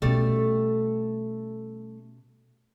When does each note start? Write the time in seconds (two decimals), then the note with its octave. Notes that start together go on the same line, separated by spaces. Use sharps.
0.02 B2 G3 A3 C#4